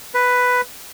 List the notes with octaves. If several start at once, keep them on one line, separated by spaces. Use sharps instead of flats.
B4